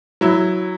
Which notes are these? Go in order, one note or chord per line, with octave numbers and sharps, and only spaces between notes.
F#3 E4